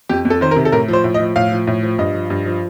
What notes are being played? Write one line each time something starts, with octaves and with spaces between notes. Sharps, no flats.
F2 G4
F2
A4
D#3 C5
A#4
C3
A4
A2 A#4
F3 C5
A2
D#5
F3
A2 F5
F3
A2
F3
G2 D#5
F3
G2
F3